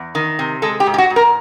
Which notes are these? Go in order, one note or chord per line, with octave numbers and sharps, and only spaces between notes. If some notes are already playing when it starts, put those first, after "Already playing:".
Already playing: E2
D#3
C3
G#3 A4
G4
G#2
G4
F#4
G#2
A#4